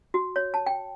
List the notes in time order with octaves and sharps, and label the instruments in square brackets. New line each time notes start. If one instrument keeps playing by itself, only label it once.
[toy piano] F#4
C#5
A5
G5